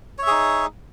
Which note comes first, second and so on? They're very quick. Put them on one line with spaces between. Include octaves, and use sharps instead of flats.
C#5 E5 G#4 D#4